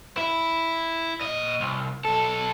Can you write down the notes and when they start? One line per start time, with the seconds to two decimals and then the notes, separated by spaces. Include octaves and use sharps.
0.18 E4
1.22 A#2 D#5
1.61 C2
2.05 B1 A4